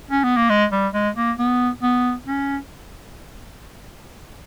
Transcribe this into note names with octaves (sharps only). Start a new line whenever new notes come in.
C#4
B3
A#3
G#3
G3
G#3
A#3
B3
B3
C#4